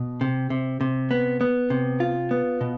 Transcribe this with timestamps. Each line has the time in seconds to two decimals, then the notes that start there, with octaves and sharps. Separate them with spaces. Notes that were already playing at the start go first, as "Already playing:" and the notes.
Already playing: B2
0.21 C3
0.50 C3
0.81 C3
1.11 B3
1.41 B3
1.70 C3
2.00 F4
2.31 B3
2.61 B2